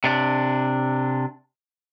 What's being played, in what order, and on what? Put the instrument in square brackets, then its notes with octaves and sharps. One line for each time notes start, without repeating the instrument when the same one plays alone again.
[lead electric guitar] C3 D4